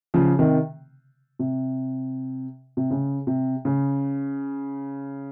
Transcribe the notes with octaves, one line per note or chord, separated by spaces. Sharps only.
C#3 F3
C3 D#3
C3
C3
C#3
C3
C#3